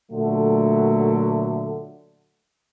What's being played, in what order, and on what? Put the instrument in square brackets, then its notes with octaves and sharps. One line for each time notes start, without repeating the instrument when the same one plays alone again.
[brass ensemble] A#2 D3 F#3 A3